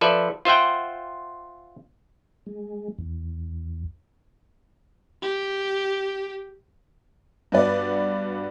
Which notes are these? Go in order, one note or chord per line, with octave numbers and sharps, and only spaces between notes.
F3 A4 B4 D5 E5
F4 C5 E5 F#5 G5
G#3
E2
G4
G2 B3 F#4 B4 D5